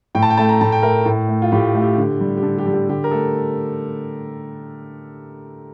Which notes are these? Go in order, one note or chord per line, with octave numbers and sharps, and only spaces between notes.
A2 G5
A5
G5
A3 A5
A#5
A2 A5
G5
A3 A#4
A2
A3
F4
A2 G4
A3
G4
D3
G3
G4
D3 A4
G4
G3
G4
D3 G4
A#4
A3 A4